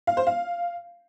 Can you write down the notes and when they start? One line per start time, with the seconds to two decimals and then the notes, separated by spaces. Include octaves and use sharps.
0.07 F5
0.17 C5
0.27 F5